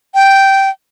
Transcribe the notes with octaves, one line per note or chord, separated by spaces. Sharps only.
G5